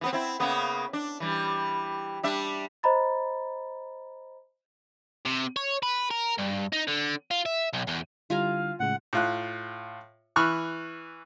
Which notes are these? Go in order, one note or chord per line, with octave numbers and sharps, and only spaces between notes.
E3 B3 C4
C4 E4
C#3 A#3 B3
D4
E3 G3
G3 D4 E5
C5 D#5 A#5 B5 A6
C3
C#5
B4
A#4
G2
D#4
D3
F4
E5
B1
E2
D3 G3 E4 F4 F5 G#5 A#5
A2 C#3 G#3 F#5
A2 F4 F#6
E3 B5 C#6 F6 F#6